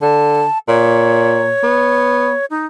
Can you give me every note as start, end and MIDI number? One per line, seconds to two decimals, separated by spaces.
0.01 0.44 50
0.01 0.58 81
0.68 1.55 46
0.68 2.45 73
1.63 2.34 59
2.50 2.66 63